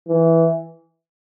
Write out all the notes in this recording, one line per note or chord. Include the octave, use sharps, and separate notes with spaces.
E3